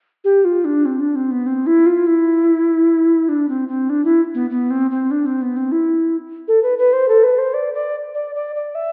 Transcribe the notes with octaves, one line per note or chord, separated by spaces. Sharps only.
G4
F4
D4
C4
D4
C4
B3
C4
E4
F4
E4
D4
C4
C4
D4
E4
B3
B3
C4
C4
D4
C4
B3
C4
E4
A4
B4
B4
C5
A4
B4
C5
D5
D5
D5
D5
D5
E5